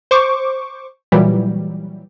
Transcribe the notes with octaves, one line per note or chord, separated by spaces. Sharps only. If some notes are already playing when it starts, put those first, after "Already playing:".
C5 C#6 D6
A#2 E3 F#3 G3